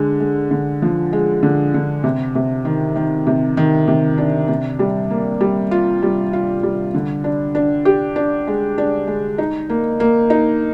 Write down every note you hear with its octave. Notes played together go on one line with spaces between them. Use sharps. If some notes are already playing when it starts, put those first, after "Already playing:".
Already playing: D3 G#3
G#3
D3
F3
G#3
D3
D3
C3
C3
D#3
D#3
C3
D#3
C3
D4
C3
G3
A#3
G3
F4
G3
F4
G3
D3
D4
D4
G4
D4
G#3
D4
G#3
D#4
A#3
A#3
D#4